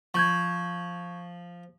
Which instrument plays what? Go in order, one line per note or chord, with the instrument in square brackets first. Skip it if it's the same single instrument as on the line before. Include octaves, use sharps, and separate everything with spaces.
[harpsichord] F3 [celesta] C#6 G6 G#6